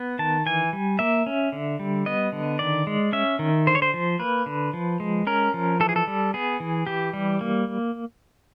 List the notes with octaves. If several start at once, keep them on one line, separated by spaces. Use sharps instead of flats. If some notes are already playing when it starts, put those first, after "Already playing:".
Already playing: B3
D#3 A5
E3 G#5
G3
A#3 E5
C#4
D3
G3
B3 D#5
D3
D#3 D5
G#3
C#4 E5
D#3
D3 C5
C#5
C5
F3
A#3 B4
D3
F3
G#3
C#4 A#4
F3
E3 A4
G#4
A4
G3
B3 G#4
E3
E3 G4
G3
A#3